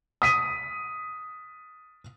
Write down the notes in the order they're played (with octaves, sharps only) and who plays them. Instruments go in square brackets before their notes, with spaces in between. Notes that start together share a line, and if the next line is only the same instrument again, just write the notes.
[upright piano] D#6 B6 D#7